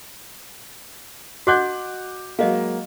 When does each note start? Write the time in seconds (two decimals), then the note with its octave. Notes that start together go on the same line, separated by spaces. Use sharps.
1.47 F#4 D#5 F#5 D6 F#6 G6
2.39 F#3 G#3 A#3 D#5 F5